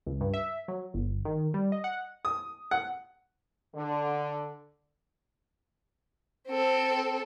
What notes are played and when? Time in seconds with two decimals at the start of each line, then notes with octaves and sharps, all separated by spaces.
0.07 C#2
0.21 G2
0.34 E5
0.68 F#3
0.94 G1
1.25 D#3
1.54 G3
1.72 D#5
1.84 F#5
2.25 D#6
2.71 F#5
3.75 D3
6.48 C4 A4